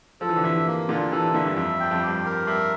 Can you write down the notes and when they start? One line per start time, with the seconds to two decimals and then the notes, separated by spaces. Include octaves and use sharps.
0.21 F3 A4
0.29 E3
0.36 D3
0.44 C3 E3 E5
0.67 A#3
0.89 A#2 D3 F4
1.12 C3 E3 A4
1.34 A#2 D3 E5
1.46 G2
1.56 F2 E5
1.80 G2 G5
1.91 F2
2.02 G4
2.08 G2
2.25 A#4
2.47 G2 E5